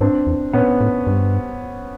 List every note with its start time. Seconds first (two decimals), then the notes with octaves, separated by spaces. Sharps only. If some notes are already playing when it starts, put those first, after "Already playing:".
0.01 G#2 C4 D4
0.27 E2
0.53 A#2 B3 C#4
0.81 A2
1.07 G2